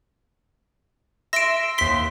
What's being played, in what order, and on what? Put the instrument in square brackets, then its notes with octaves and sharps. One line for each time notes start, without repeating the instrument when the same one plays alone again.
[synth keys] E5 C6 E6 [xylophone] A#6 D7
[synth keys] D#2 C6 [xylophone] B6 G7